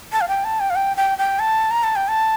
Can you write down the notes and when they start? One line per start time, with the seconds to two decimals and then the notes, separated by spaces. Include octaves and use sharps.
0.13 A5
0.21 F5
0.28 G5
0.44 A5
0.60 G5
0.70 F5
0.76 G5
0.97 G5
1.18 G5
1.39 A5
1.71 A#5
1.84 A5
1.96 G5
2.08 A5